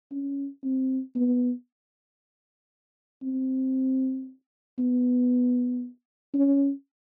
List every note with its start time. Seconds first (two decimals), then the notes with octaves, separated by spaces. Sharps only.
0.12 C#4
0.64 C4
1.15 B3
3.23 C4
4.79 B3
6.34 C#4